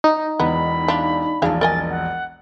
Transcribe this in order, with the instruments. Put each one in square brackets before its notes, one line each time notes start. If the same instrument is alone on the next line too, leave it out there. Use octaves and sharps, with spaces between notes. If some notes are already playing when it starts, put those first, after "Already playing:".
[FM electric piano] D#4
[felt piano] E1 E2 [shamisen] B3 [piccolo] B5
[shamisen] D4 F4
[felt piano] E1 A#1 A5 [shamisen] G#4 F5
[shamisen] A#4 D#5 G#5 [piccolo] A6
[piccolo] F#5